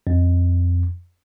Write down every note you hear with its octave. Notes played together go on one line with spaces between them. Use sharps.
F2